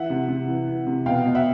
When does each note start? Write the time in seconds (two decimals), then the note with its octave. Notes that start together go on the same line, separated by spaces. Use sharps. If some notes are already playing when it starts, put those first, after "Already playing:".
Already playing: E3 E5 F#5
0.10 C3
0.28 C3
0.48 E3
0.68 E3
0.87 C3
1.06 B2 F5 G5
1.26 B2
1.35 E5 F#5